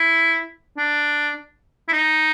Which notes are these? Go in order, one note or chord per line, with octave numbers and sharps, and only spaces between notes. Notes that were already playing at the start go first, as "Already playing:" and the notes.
Already playing: E4
D4
E4
D#4